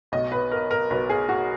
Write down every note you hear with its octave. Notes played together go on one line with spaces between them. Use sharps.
B1 B2 D#5
B4
A#4
A#4
B1 B2 B4
G#4
F#4